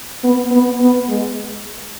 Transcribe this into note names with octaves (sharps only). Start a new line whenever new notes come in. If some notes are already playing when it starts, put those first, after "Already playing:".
B3
B3
B3
G#3